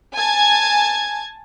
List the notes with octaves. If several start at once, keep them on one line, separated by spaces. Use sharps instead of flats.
G#5 A5 G#6